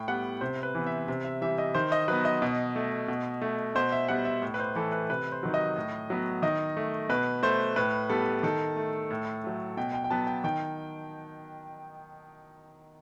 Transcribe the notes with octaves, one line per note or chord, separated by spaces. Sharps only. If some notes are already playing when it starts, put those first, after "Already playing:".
Already playing: A2 G5
G3 B3 F#5
C3 C5
B4
E3 B3
E5
C3
E5
E3 G3 E5
D#5
D#3 C5
D#5
F#3 B3 B4
D#5
B2
A3
B2
A3
B2 C5
E5
G3 B3 F#5
E5
A2
B4
C5
E3 A3 A4
B4
C3 B4
C5
D#3 F#3
D#5
A2
F#3 B3
D#3 D#5
A3
B2 B4
A3 C5
A2 B4
G3 B3 A4
D#3 A4
A3
A2
F#3 A3
B2 G5
G5
G5
F#3 B3 A5
G5
D#3 G5